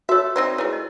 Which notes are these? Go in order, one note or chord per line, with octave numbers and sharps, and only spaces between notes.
F#4 A4 C#5 E5
C4 D#4 C5 D5
A3 E4 G#4 B4 C#5
D#5